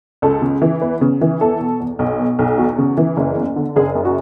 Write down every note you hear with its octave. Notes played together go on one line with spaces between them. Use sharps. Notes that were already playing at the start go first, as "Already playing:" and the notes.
C#2 A4
C#3
E3
E2 B4
C#3
E3
E2 A4
B2
E2
B1
B2
B1
E2 F#4
C#3
E3
F#1
E2
D3
F#1 G#4
F#2
F#4